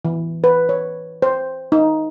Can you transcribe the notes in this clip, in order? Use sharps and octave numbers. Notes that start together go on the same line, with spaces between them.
E3
B4
C#5
C5
D#4